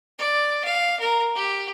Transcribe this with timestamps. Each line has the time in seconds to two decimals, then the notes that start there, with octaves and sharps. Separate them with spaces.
0.19 D5
0.65 F5
1.00 A#4
1.36 G4